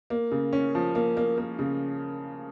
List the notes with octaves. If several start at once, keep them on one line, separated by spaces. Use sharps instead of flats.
A#3
C#3
C#4
F3
A#3
A#3
A#3
C#3